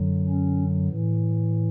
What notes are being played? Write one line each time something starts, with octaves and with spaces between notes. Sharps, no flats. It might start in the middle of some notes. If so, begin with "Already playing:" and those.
Already playing: F#2 D3 F#3
C#4
A2 E3